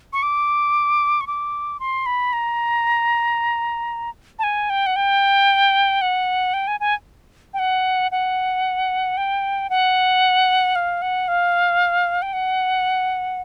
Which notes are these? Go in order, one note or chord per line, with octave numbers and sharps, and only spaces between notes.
C#6
D6
C#6
D6
C6
B5
A#5
A5
G#5
G5
F#5
G5
F#5
G5
G#5
G#5
G5
F#5
F#5
G5
F#5
F5
F#5
F5
G5
F#5